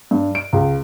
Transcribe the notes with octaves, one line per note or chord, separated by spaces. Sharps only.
G2
D7
C#2